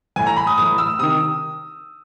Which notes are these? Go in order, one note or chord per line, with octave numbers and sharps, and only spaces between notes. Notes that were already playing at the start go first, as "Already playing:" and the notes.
A2 E3 G#5
A#5
B5
D#6
A2 E3 D#6
E6
C3 D#3 D#6